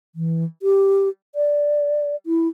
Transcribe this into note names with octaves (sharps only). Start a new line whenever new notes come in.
E3
G4
D5
E4